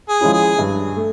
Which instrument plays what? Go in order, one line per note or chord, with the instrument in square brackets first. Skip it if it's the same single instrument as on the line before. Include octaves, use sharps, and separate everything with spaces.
[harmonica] G#4
[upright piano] F3 G#3 C#4 E4
[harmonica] G#4
[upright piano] G2
A3